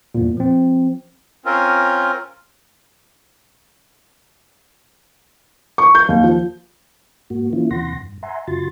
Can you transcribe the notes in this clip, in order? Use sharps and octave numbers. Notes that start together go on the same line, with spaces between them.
E2 G2 A#2
F3 C4
C4 C#4 F4 A#4
C#6
G6
D#2
F3
G#2 A#3 F#4
D#3 E3 A#3 C#4 E4 F4
D#2 C3 E3 F#5 C6 A#6
G2
E5 F#5 G#5 A#5 C6
F#2 C#3 F4 F#4 C6 A6